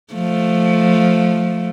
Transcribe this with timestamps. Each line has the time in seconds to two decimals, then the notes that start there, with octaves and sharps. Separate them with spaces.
0.14 F3 A3